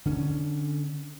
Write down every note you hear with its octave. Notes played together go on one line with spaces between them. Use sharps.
D3 C#4